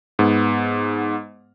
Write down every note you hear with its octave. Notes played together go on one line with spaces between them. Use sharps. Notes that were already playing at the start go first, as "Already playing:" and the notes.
G#2 B3